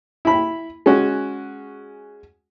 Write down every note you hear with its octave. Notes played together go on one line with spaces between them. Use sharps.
E4 B5
G#3 C#4 F#4